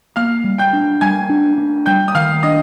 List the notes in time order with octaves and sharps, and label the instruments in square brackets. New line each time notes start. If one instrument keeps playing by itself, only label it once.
[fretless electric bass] A#3 [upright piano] F5 F6
[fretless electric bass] G3
[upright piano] G5 G6
[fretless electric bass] D4
[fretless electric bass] G3 [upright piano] G#5 G#6
[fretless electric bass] D4
D4
[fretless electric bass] G3 [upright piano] G5 G6
[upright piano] D#6
[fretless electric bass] D#3 [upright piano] F5 F6
[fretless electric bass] D4 [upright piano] D#5 D#6